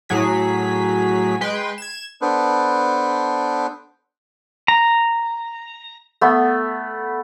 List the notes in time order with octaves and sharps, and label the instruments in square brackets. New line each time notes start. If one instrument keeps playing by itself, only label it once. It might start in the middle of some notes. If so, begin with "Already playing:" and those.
[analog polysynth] A2 F#3 G#4 B6
G#3 B4 G5 C6
G#6 E7
[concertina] B3 D4 A4 B4 C5
[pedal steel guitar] A#5
[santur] A3 B3